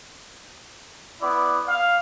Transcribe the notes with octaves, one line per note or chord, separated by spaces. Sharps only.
B3 E4 D5
F5